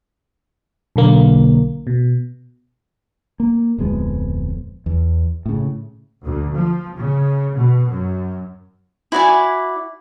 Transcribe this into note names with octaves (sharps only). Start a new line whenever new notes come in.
B1 D3 A#3
B2
A#3
D1 F2 G#3 B3
E2
A2 C#3
D2
F3
C#3
B2
F#2
E4 F#4 D5 G#5